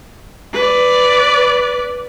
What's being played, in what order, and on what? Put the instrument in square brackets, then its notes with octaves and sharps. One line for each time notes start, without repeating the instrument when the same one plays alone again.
[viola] B4 D5